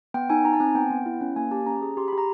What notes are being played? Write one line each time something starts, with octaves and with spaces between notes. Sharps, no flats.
B3 G5
D#4 G#5
D#4 A#5
A5
C4 G#5
B3 G5
B3
E4
C#4
A#3 G#5
G4 A5
C#4 A#5
G#4
G4 C6
G4 B5
A#5